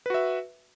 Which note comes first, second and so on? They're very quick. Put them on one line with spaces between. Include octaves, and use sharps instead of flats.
B4 F#4 E5